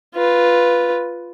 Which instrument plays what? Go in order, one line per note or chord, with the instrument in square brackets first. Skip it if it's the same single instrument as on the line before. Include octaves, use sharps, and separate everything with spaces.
[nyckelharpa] F4 B4